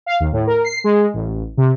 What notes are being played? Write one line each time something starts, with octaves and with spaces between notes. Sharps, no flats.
F5
D#2
A2
A#4
C7
G#3
A1
C3